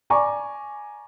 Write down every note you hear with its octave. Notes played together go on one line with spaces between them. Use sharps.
D5 G#5 A#5 C#6 D6